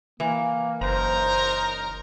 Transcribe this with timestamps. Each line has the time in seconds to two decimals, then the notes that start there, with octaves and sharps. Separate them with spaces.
0.20 E3 A#3
0.81 F#1 D#4 A#4 C5 A#5